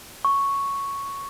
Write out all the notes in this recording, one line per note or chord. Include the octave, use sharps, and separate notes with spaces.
C#6